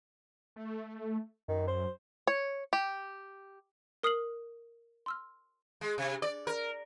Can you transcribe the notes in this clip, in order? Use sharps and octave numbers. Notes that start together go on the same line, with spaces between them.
A3
F#2 D#3
C5
C#5
G4
A#4 D#6 F6 C7 F#7
C6 E6 F6
G#3
C3
D5
A#4